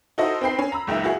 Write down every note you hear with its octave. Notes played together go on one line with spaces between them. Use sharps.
D#4 E4 F#4 A4 C5 D#5
C4 D#4 B4 G5 B5 C7
C#4
A#5 B5 E6
F#1 C#2 D#4 E5
E4 F#4 G#4